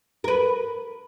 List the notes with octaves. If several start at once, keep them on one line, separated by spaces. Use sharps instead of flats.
A#4 B4